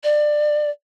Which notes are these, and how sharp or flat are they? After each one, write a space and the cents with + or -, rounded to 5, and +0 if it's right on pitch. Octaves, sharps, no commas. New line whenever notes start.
D5 +20